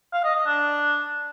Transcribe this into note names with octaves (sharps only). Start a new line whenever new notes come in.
F5
D#5
D#5
D4